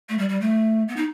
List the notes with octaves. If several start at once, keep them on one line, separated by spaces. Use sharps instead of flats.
A3
G3
G3
A3
B3
D#4